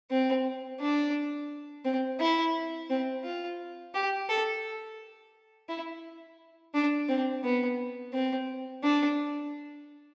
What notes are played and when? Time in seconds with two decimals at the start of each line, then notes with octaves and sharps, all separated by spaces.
0.11 C4
0.80 D4
1.85 C4
2.20 E4
2.90 C4
3.24 F4
3.94 G4
4.29 A4
5.69 E4
6.74 D4
7.09 C4
7.44 B3
8.13 C4
8.83 D4